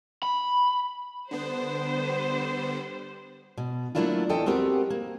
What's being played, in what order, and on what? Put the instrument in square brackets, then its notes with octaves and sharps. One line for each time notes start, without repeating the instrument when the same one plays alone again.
[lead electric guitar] B5
[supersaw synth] D3 B3 [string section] G3 C5
[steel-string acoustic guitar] B2
F#3 A3 A#3 D4 E4 F4
E2 E3 A4 D#5 G5
B3 C4 F#4 G4 A#4
A#3